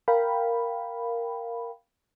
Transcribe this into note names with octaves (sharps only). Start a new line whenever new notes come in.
A#4 F5 G5 B5